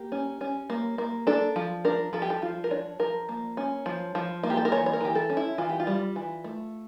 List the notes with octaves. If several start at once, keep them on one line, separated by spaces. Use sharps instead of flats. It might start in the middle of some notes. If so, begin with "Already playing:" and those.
Already playing: A#3 G4
C#4
C#4
A#3
A#3
D4 A4
F3
D4 A#4
F3 A4
G4
A4
F3 F4
A#4
D4 C#5
F3 A#4
A#3
C#4
F3
F3
A#3 F4
G4
A4
A#4
E3 C#5
C#5
A#4
E3 G4
A4
C#4
E4
E3 F4
G4
F4
G3
E3
A3